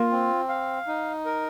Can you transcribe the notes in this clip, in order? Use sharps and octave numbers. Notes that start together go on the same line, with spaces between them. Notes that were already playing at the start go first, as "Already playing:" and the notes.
Already playing: A#3 F4
C4
F5
D#4
A#4